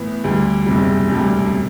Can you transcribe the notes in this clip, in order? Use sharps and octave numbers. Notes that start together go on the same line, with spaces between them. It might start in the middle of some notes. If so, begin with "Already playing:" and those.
Already playing: A2 E3 B3 E4
D2 D3 G3
F#1 E2 C3 G3
E1 D2 C3 G3 D4
B2